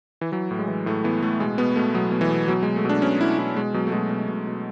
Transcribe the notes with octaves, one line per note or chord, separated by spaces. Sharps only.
E3
E3 F#3
A2
G#3
E3
A2 A3
E3 B3
A2 A3
B2 G#3
B2 B3
B2 A3
B2 F#3
B2
E3
B2
B2 F#3
B2 G#3
A3
B2 D4
B2 C#4
B2 E4
B2 E4
B2 G#3
B2 F#3
A3
B2 G#3
B2
B2
B2